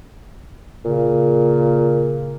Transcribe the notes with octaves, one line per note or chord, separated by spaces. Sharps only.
A#2 C#3